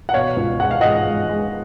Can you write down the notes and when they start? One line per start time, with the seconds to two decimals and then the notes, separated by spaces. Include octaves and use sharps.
0.09 F#5
0.14 B2 C#5 F5
0.36 C#2
0.60 G#3 F#5
0.71 F5
0.81 G#3 D#5 F#5
1.06 G#3
1.29 G#3